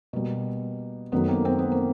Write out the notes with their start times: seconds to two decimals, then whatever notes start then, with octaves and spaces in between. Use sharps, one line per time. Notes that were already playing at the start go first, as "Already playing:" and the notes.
0.13 B2 G3 A#3
1.12 F#2 D#3 F#3 A3 B3
1.28 A#3 C4
1.45 C4
1.59 B3
1.72 A#3 C4